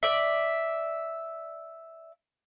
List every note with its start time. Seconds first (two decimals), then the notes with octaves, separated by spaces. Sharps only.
0.03 D5 E5